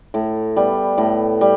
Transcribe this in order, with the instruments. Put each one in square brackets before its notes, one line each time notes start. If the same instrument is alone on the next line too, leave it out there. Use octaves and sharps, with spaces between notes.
[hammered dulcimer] A2
G3 B3
A2
G3